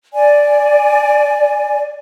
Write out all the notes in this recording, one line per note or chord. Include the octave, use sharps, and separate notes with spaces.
D5 G#5